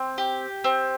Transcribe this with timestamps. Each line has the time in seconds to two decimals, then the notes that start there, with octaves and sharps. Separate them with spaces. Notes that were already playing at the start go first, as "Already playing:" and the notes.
Already playing: C4
0.18 G4
0.64 C4